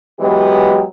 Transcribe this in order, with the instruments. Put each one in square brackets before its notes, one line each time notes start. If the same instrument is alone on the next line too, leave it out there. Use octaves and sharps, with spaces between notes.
[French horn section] E3 F#3 G#3 B3 G4